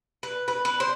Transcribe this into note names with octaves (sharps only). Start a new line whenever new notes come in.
B4
B4
B4
C5